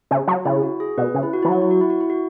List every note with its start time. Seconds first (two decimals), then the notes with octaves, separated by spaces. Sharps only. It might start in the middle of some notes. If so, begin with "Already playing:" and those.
0.11 C#3
0.27 F#3
0.45 C#3 E4
0.63 F#4
0.80 G#4
0.98 B2 B4
1.15 C#3
1.23 E4
1.33 F#4
1.43 E3 E4
1.49 F#3 F#4
1.62 E4
1.71 F#4
1.81 E4
1.90 F#4
2.00 E4
2.10 F#4